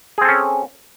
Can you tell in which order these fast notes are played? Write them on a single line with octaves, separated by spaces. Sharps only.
G#4 C4 A4 C#4